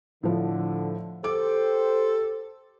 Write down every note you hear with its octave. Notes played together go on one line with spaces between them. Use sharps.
A2 D3 F3
G4 A4 C5 D6